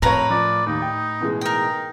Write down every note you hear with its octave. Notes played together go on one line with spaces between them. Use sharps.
F2 A2 A#4 B4 C#5 A#5
F3 D5
D#2 D#4
G5
B2 E3 G#3
D#4 A#4 G5